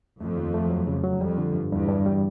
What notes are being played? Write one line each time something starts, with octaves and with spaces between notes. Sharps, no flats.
F2 A3
D#2
A3
F#3
C#3
F#3
F2 G3
D3
G2
E2 G2
G2
G3